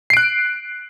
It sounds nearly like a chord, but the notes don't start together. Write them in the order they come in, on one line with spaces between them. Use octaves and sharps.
C7 D7 F#6